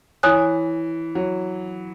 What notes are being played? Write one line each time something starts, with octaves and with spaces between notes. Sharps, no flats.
E3 C#5 G#5 D#6 F#6
F#3